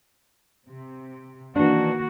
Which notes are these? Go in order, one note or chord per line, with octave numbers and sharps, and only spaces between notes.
C3
D#3 E3 A#3 D4 F#4